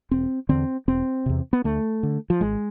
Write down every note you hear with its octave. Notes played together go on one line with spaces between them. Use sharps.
E1 C4
E2 D3 C4
E1 C4
E2 C3
B3
D2 A3
D3
F3
G#1 G#3